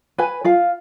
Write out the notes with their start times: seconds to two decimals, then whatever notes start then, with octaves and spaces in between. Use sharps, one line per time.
0.18 B4 G#5
0.44 F4 F5